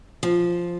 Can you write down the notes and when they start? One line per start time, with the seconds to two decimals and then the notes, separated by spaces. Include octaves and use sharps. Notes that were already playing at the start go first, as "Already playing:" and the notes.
0.23 F3